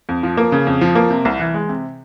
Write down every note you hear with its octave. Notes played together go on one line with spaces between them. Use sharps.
F2
F3
A#3
C#3
F2
F3
A#3
C3
C2
E3
G#3
C3